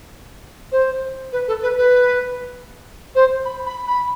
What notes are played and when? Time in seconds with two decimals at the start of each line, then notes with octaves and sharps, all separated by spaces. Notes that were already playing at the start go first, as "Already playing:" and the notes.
0.72 C5
1.32 B4
1.48 A4
1.63 B4
1.77 B4
3.15 C5
3.45 B5
3.66 B5
3.87 B5